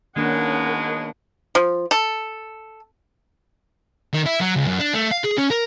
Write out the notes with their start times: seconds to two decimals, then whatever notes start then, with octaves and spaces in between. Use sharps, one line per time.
0.16 B2 D#3 G#3 A#3 C#4 D4 A#4 F#5
1.55 F3
1.91 A4
4.13 D#3
4.26 E4
4.40 F#3
4.56 C#2
4.67 F#2
4.79 D4
4.94 A3
5.11 F5
5.24 G#4
5.38 C#4
5.51 A#4